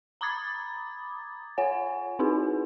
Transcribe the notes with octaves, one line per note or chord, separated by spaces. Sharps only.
A#5 B5 D6 D#6 G#6 A6
F4 C#5 F#5 G#5
C4 D#4 E4 F#4 G#4 B4